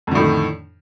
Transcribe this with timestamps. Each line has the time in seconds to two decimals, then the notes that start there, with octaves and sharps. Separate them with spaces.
0.07 F2
0.11 D3
0.15 A2
0.19 D#3